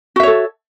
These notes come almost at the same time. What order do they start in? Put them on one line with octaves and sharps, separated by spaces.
F#4 E5 C#5 A4